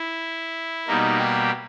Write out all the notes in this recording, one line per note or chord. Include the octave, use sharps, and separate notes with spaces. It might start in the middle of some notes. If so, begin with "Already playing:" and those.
Already playing: E4
B2 G3 A#3 D#4
G4